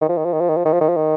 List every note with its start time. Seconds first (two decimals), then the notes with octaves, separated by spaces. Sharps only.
0.02 D#3
0.09 F3
0.17 D#3
0.25 F3
0.33 D#3
0.41 F3
0.49 D#3
0.57 F3
0.65 D#3
0.73 F3
0.81 D#3
0.89 F3
0.97 D#3